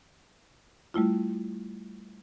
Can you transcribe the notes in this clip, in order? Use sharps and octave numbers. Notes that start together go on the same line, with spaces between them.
G3 A3 E4 F4